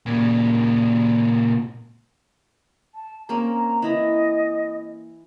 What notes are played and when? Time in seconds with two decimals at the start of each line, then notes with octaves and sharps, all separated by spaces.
0.06 A#2 C#3
2.95 A5
3.29 A#3 C4 C#4 A#5
3.82 E3 E4 D#5 A#5